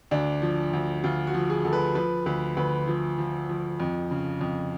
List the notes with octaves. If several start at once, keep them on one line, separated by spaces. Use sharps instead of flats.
D2 D4
F3
D2
D2 F4
F#4
F3
G#4
D2 A4
B4
F3 B4
D2 B4
D2 B4
F3
F3
F3
F2
C#3
F2